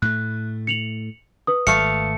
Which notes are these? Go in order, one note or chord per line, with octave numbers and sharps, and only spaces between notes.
A2 A3 F#6
C#7 F7 F#7
B4 D#6
G#1 A3 F5 C#7